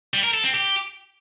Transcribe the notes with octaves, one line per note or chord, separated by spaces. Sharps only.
G3
A#4
A4
C4
G4